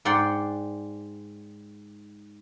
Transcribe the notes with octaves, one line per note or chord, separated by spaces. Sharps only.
G#2 D5 F#5 G5 C6